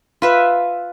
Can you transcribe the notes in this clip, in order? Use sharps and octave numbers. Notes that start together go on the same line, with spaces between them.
F4 B4 E5